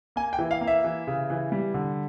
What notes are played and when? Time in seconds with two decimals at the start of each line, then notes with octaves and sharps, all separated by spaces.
0.16 A#3 G#5
0.33 G5
0.39 E3
0.51 F5
0.61 A#3
0.67 E5
0.84 E3
1.07 C#3
1.30 E3
1.52 G3
1.74 D3